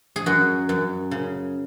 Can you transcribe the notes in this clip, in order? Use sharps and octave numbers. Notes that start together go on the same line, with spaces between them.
G#4
F#2 F#4
F#2
C#3